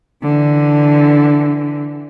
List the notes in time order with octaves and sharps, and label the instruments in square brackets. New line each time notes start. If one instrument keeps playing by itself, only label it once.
[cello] D3 E3